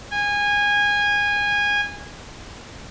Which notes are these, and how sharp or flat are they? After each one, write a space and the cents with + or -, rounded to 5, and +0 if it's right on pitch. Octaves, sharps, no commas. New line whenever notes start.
G#5 -20